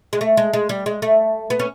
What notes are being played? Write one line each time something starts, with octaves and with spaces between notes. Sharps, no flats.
G#3
A3
G#3
G#3
G3
G#3
A3
B3
C#4